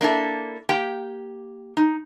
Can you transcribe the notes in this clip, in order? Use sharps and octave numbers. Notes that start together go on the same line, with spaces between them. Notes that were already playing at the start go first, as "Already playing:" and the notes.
A#3 D4 E4 A4
A#3 G4 G5
D#4